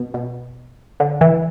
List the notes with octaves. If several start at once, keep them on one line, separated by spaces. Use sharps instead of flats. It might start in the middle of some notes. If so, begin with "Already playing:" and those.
Already playing: B2
B2
D3
E3